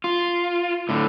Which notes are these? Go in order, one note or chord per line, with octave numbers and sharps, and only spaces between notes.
F4
A2 D3